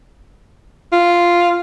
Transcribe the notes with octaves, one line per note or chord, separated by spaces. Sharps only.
F4